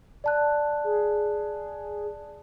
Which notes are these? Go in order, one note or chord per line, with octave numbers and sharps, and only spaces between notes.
D5 A5 F#6
G#4